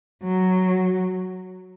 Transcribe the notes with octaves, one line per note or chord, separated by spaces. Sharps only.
F#3